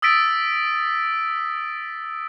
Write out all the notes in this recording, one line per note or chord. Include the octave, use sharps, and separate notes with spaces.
D#6 E6 A6 B6 D7